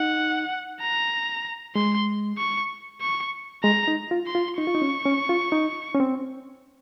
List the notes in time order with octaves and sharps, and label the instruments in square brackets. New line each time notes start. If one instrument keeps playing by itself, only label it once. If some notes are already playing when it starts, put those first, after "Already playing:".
Already playing: [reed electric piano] D#4 [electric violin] F#5
[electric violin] A#5
[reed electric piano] G#3 [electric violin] C6
[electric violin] C#6
C#6
[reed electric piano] G#3 [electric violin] A#5
[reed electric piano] D#4
F4
[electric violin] C6
[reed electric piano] F4
[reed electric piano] D#4 [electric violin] C#6
[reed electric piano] F4
D#4
C#4
C#4
F4
D#4
C#4
C4